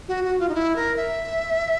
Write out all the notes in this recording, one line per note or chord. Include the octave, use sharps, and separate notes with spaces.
F#4
F#4
F4
D#4
E4
A#4
E5